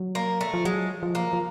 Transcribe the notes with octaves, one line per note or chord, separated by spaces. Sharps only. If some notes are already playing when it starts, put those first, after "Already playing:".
Already playing: F#3
A#3
A3
F3
F#3 G#3
F3
A#3
F3